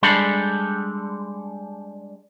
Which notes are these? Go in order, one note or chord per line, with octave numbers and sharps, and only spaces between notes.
G3 G#3 D4 G4 A4 B5